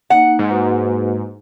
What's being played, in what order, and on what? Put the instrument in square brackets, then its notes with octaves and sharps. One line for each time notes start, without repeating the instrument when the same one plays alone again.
[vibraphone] A#3 D#4 [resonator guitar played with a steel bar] F#5
[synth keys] G#2
[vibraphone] A#3 F#4 B4